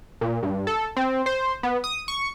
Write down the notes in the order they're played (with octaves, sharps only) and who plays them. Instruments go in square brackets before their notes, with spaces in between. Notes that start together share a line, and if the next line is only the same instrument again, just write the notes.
[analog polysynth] A#2
G2
A4
C4
C5
B3
D#6
C#6